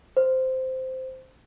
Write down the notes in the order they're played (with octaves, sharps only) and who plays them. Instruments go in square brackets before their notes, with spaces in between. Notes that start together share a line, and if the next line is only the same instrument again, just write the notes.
[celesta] C5